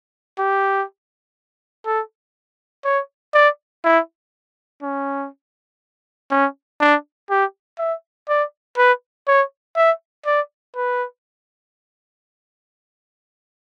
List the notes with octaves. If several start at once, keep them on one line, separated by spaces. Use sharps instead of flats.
G4
A4
C#5
D5
E4
C#4
C#4
D4
G4
E5
D5
B4
C#5
E5
D5
B4